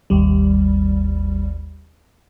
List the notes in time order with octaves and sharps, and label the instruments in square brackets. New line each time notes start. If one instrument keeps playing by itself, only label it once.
[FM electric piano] G#1 D#2 G3